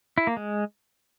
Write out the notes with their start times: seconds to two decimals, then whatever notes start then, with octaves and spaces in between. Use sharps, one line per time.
0.18 E4
0.27 A#3
0.37 G#3